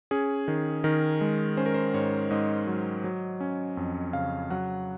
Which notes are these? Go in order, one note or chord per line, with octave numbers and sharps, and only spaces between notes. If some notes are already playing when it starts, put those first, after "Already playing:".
C#4 G#4
D#3
D#3 A#4
G#3
C#4 C5
A#4
C5
G#2 C#5
G#2 D#5
F#3
F#3
C#4
F2
C#3 F5
F#3 F#5